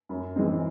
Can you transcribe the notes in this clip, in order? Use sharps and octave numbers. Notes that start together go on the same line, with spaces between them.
F#2
E3 G#3 C4